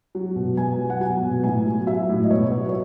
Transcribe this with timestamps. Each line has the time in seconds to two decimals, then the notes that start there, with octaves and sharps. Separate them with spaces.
0.15 F#3
0.36 B2
0.57 B2 G#5
0.79 F#3
0.90 F#5
1.01 F#3 G#5
1.22 B2
1.43 A2 G#5
1.65 F#3
1.87 F#3 E5
2.09 A2
2.24 D#5
2.30 B2 C#5
2.52 F#3
2.69 C#5